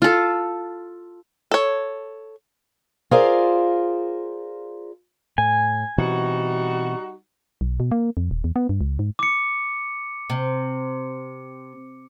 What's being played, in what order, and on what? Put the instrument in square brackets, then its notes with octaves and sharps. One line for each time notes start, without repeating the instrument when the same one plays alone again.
[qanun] F4 A4
[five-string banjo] A4 C#5
[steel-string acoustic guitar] F4 G#4 A#4 C5 D5 F5
[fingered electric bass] A2 [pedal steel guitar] G#5
[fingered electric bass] B2 E3 C4 [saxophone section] G3 D#4 F#4
[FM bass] B1
B2
A#3
F2
D#1
E2
B3
G2
C#2
G#2
[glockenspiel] D6 C#7
[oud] C3